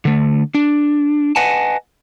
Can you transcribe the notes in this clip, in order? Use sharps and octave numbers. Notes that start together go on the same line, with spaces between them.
D3 A3
D4
B4 D#5 F#5 G#5 A5